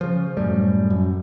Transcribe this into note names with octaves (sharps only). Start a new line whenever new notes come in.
C#3 F3
F#2 A2 G3
F#2